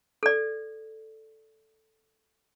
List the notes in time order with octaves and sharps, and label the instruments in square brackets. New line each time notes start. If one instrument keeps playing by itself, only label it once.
[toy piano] A4 D5